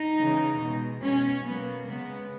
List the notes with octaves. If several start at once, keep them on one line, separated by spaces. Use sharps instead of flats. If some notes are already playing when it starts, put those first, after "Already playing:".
Already playing: D#4
C#3 E3 G#3
B2 G#3
B2 G#3 C#4
B2 F#3 A#3 B3
C#3 G#3 B3